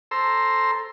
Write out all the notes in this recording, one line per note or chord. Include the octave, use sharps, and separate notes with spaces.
A4 C5 A#5 C6 E6